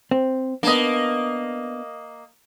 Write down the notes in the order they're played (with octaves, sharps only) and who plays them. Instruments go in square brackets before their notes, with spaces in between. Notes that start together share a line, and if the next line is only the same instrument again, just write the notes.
[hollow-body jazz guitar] C4
[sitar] A#3 D#5 [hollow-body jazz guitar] B3 D4